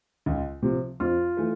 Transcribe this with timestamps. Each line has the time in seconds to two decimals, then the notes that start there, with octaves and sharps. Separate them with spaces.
0.26 C#2
0.62 C3 F3
1.00 F2 F4
1.37 E3 A3